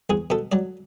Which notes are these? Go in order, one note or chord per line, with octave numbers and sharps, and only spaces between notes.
E2 G#4
B2 A4
F#3 D5